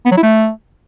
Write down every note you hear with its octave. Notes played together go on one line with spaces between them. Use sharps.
B3
F#3
E4
A3